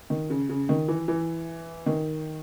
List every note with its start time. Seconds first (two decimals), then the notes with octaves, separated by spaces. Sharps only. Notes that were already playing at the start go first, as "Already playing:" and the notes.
0.10 D#3
0.30 C#3
0.49 C#3
0.69 D#3
0.88 E3
1.08 E3
1.86 D#3